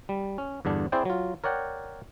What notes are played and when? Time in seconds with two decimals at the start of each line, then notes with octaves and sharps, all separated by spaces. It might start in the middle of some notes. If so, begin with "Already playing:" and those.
0.09 G3
0.38 C#4
0.65 E2 G2 D3 D4
0.92 C4 E4 G#4 C5 D5 G5
1.05 F#3 F4
1.44 A#4 C#5 D5 F#5 G5